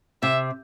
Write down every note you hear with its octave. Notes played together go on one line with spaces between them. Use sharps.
C3 E5